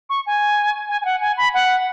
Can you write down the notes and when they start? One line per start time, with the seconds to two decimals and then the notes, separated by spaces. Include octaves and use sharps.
0.10 C#6
0.26 G#5
0.89 G#5
1.01 G#5
1.05 F#5
1.21 G#5
1.37 B5
1.54 F#5